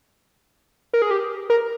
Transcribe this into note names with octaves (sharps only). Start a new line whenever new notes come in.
A#4
G#4
G4
A#4